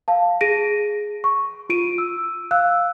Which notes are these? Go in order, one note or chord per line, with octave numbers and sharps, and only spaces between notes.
F5 A5
G#4 A#6 D7 D#7
C#6
F4 D7 D#7
E6
F5 E6 F#6